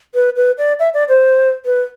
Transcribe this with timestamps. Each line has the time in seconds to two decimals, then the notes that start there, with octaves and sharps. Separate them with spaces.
0.15 B4
0.36 B4
0.58 D5
0.79 E5
0.94 D5
1.09 C5
1.66 B4